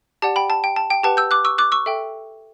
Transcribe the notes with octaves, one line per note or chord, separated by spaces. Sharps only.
G4 D5 F#5 A5
G5 B5
A5
G5
A5
G5
G4 B4 F#5 A5
E6 G6
D6 F#6
C#6 E6
D6 F#6
C#6 E6
A4 E5 G5